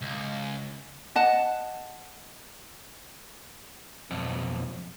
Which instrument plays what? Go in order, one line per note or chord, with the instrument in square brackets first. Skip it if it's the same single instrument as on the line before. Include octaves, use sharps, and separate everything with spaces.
[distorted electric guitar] C#2
[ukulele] D#5 F#5 A5
[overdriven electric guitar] B1 F2